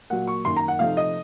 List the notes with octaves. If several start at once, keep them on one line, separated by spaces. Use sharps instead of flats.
A#2 F#3 A#3 F#5
C#6
F#2 D#3 A#3 C6
A#5
F#5
C3 F3 A3 D#4 F5
D#5